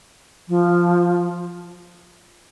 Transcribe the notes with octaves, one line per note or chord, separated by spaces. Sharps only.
F3